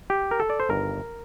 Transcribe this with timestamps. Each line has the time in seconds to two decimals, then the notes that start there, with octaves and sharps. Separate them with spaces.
0.10 G4
0.31 A#4
0.40 A4
0.50 D5
0.60 C5
0.69 G1 G2 D#3 A#4